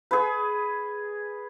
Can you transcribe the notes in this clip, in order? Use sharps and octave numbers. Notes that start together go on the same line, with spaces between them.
G#4 B4